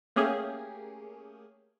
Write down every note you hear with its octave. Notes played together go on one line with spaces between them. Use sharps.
A3 A#3 C#4 G4 G#4